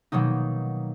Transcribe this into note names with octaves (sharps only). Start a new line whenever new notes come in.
B2 D#3 F#3 A#3 D#4